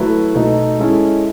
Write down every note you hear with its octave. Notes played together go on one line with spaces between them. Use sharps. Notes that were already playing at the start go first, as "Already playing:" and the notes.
Already playing: F#3 A3 E4 B4
B2 A3 D#4
G#3 C#4 E4 A4